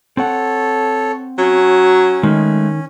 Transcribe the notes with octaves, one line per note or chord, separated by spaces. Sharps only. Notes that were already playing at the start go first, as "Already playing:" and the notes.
C4 A4 C#5 F#5
F#3 C#4
D#3 G#3 A3